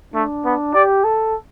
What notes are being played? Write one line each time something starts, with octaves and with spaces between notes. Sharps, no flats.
A3 D4
B3
G4 D5
A4